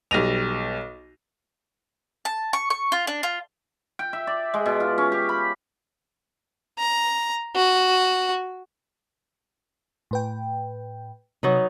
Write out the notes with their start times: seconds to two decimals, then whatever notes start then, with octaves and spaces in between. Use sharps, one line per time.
0.11 B1 G3 A#6 D#7 F7
2.25 A5
2.53 C#6
2.70 C#6
2.92 F4
3.07 D4
3.23 F4
3.99 G5
4.13 E5
4.27 D5
4.54 G#3
4.66 B2
4.80 F4
4.98 C#4
5.12 G4
5.29 B5
6.78 A#5
7.56 F#4
10.11 A2 B4 G5
11.43 C3 F#3 B3 D#4